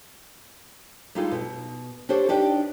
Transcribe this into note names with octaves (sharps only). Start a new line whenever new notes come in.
G3 G#3 D#4 F4 G#4 A4
B2
D4 G4 A4 C5 C#5
D4 D#4 G4 B4 D5